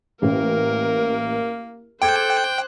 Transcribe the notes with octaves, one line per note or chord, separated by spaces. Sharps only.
A1 A#3 C#4 A#4
A4 C5 G5 D6 F#6 G#6